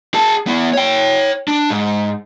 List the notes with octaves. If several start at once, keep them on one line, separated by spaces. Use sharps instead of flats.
G#4 A5
B3 E4
C#5 G5
D4
G#2